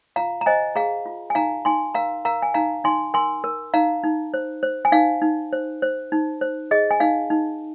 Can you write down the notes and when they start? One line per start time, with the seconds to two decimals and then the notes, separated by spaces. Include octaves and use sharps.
0.16 F4 F5 A#5
0.41 A#5
0.46 C5 D#5 G#5
0.76 G#4 F5 A#5
1.06 F4
1.30 G#5
1.35 D#4 F5 A#5
1.65 D#4 G#5 C6
1.94 A#4 F5 A#5
2.25 A#4 F5 A#5
2.42 G#5
2.54 D#4 F5 A#5
2.84 D#4 G#5 C6
3.14 A#4 G#5 C6
3.44 A#4
3.74 D#4 F5 A#5
4.04 D#4
4.34 C5
4.63 C5
4.85 G#5
4.92 D#4 F5
5.22 D#4
5.53 C5
5.82 C5
6.12 D#4
6.41 C5
6.71 G#4 D#5
6.91 G#5
7.00 D#4 F5
7.30 D#4